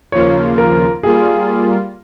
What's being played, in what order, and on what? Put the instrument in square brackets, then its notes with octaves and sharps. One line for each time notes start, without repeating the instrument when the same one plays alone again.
[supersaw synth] D#2 C#3 F3 A#3 F4 [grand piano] C#5
[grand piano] A#4
[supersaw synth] G3 A#3 F4 [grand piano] G#4